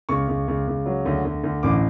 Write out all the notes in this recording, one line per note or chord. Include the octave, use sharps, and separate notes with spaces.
C#2 C#6
C#2
C#2
C#2
F#3
D2
D2
D2
A1 D6